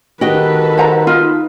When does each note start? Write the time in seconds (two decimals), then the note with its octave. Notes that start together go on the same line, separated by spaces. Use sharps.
0.21 D#3 F#4 G4 A4 B4 D#5
0.77 C5 F#5 A#5
1.07 D#4 F4